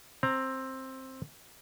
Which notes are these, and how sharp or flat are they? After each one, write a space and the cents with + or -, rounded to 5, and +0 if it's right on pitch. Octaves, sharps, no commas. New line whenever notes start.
C4 +10 A#5 -5